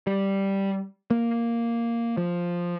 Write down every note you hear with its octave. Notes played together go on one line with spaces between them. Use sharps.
G3
A#3
F3